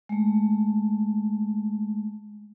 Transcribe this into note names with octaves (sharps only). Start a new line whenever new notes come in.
G#3 A3